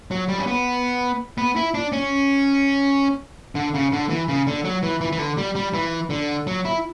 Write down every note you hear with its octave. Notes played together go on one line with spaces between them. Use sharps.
F#3
G3
C#4
B3
B3
E4
D4
C#4
D3
C#3
D3
E3
C#3
D3
F#3
E3
E3
E3
D3
G3
G3
E3
D3
F#3
E4